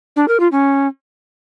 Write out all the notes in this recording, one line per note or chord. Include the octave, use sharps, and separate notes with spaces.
D4
A#4
F4
C#4